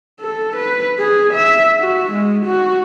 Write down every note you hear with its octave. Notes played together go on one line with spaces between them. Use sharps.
A4
B4
G#4
E5
F#4
G#3
F#4